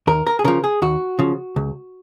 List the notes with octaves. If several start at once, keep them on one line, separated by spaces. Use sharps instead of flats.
D#2 A#4
A#4
G#4
C#3 F3 A#4
G#4
D#2 F#4
C#3 F3
C#2